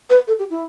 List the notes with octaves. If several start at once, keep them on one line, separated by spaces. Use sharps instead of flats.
B4
A4
G4
E4